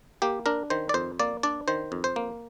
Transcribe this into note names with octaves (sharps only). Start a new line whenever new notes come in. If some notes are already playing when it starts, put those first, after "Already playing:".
A#3 G4
D4 A#4
D#3 C5
D5
F2 C5
A#3 D5
D4 D5
D#3 C5
F2
C5
A#3